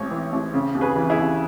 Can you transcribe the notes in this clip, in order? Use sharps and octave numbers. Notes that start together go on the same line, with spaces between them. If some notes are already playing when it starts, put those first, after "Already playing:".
Already playing: A1 G#2 C#5
E3
A1
C#3
D#2
G#4 B4
E3
E4 G#4
D#2